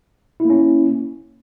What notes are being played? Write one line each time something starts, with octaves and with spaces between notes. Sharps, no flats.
A#3 C#4 E4